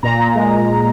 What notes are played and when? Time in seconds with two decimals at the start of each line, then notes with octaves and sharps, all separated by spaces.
0.03 A#2 A#5
0.19 A#2
0.35 G#3